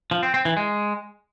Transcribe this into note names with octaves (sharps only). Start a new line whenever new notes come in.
F3
C4
C4
E3
G#3